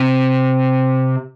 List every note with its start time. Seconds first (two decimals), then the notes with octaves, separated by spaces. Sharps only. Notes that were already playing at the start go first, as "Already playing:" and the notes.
Already playing: C3